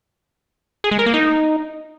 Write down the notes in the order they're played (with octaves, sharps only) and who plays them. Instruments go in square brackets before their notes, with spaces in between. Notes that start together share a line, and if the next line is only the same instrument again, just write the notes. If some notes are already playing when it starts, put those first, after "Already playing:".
[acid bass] G#4
G#3
A#4
A#3
D#4